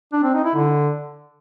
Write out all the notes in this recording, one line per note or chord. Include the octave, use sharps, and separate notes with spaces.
D4
C4
D#4
E4
D3